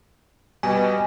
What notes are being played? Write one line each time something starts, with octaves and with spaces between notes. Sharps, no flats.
B2 G3 B4 D#5 G#5